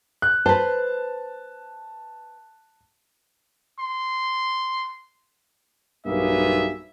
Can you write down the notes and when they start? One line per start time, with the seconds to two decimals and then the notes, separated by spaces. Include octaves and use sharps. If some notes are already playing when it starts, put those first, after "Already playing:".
0.22 F#6
0.46 B4 C5 A5
3.79 C6
6.06 B1 G2 A#3 B3 G#4 E5